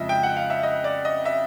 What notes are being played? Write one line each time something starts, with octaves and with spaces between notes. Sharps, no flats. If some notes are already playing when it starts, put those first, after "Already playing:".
Already playing: F2 C#3 F3 G#3 D#5 E5
G5
F#5
F5
E5
D#5
D5
D#5
E5